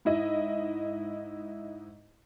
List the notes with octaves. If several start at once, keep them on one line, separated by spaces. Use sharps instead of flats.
G#2 E4 D#5